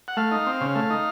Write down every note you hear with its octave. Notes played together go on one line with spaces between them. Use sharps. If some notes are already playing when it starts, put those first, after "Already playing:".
F#5
A3 F5
D#4
C4
C#3
A3
D#4